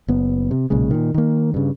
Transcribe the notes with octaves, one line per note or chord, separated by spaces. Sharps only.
F#1 B3
C3
B1 A#2 C#3 G#3
A#2 D#3
D#3 A#3
G2 C#3